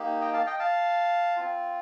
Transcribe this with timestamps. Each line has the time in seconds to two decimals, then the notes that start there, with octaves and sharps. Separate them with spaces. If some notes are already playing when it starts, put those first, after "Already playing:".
Already playing: A#3 D#4 G4
0.21 D#5 G5
0.33 F5 A5
0.46 D#5 G5
0.59 F5 A5
1.36 C4 F4